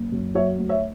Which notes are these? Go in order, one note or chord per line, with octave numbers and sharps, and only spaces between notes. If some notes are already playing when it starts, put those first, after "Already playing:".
Already playing: F#1
F#2
F#3 C#5 E5
D2
C#5 E5